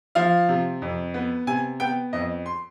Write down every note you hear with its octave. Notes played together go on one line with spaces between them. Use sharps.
F3 F5
C3
F2
B3
C3 G#5
B3 G5
F2 D#5
C6